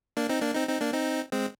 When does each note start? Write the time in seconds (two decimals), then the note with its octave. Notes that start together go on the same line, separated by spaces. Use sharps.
0.17 A#3 D4
0.29 C4 D#4
0.42 A#3 D4
0.55 C4 D#4
0.68 C4 D#4
0.81 A#3 D4
0.93 C4 D#4
1.32 G#3 C4